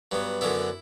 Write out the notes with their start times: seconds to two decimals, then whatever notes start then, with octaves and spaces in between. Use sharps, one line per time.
0.11 G2 F#3 B3
0.41 F#2 D3 F#3 B3 E4